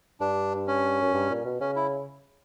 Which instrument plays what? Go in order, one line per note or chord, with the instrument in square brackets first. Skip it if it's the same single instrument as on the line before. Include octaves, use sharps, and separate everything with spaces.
[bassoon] G2 [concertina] D4
[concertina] C#4
[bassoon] F#2
G2
A#2
B2
[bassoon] C#3 [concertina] C#4
[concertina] E4